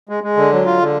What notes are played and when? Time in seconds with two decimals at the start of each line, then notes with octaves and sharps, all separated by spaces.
0.09 G#3
0.24 G#3
0.37 D3
0.52 F#3
0.66 F4
0.80 D3